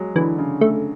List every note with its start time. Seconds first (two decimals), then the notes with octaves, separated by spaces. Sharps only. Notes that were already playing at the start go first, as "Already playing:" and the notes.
Already playing: F#3 G#3
0.16 D3 E3
0.38 C#3
0.61 A3